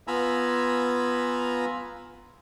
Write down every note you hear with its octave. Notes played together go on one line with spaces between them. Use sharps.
B3 F4 G#5 A#5 B5 E6